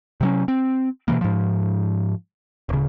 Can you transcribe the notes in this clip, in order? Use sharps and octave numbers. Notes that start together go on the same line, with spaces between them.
C3 F#3 C#4
C4
B2 D3 E3 A#3
G#2 F3
D1 C#3